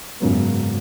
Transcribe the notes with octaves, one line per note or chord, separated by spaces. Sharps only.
G#1 F#2 C#3 F#3 B3